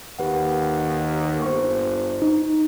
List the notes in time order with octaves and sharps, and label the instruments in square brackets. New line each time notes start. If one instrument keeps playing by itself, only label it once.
[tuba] D#2 [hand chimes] G4 B4 F#5
[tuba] G1 [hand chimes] C5 C#6
[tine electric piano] D#4